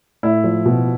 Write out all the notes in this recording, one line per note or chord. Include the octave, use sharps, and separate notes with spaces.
A2 E4
F3
B2